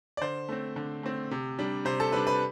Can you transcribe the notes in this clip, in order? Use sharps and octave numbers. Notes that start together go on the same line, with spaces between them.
D5
D3 C5
A3 C4
D3
A3 C4
C3
G3 D4
C3 C5
A4
G3 D4 B4
B4